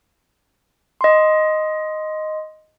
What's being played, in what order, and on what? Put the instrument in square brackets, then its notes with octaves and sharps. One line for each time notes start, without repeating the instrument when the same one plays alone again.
[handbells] D#5 C6